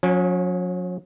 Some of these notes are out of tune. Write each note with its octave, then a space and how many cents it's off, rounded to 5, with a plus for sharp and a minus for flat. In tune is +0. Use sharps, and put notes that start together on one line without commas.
F#3 -45 C#4 +0